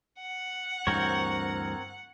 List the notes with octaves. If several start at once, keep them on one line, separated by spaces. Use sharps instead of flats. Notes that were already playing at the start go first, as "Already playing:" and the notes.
F#5
D2 G2 E3 C4 A#4 C#5